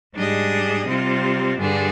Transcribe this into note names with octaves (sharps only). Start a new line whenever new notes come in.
G#2 G3 D4 G#4 D#5
C3 G3 C4 F4
G2 D3 G3 D4 G#4